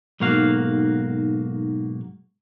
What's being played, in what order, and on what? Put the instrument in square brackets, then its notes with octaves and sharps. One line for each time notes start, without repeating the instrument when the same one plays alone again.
[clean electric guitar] B1 G#2 A#3 F#4 F5